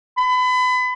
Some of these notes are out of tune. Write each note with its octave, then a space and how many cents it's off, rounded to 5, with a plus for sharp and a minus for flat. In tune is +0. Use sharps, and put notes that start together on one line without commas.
B5 +30